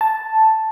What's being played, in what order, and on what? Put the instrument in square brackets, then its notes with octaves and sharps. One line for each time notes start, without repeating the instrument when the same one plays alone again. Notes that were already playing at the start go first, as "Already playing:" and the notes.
[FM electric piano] A5